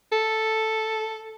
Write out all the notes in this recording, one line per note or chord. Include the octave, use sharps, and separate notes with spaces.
A4